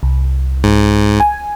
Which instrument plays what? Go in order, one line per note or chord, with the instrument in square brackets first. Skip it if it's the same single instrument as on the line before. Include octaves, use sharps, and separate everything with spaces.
[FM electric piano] C2
[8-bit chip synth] G#2
[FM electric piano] G#5